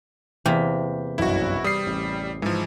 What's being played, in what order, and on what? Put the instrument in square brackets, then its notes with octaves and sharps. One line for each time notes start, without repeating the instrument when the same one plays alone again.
[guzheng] E2 C3 A#3 [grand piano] G6 B6
[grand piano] F#1 B1 G2 [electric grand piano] E4 F#4
[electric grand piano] G3 C7 [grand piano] D#6
[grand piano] A1
[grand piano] G#2 [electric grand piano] E3 F3